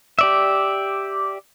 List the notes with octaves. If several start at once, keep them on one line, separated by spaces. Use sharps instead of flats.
G4 D5 E5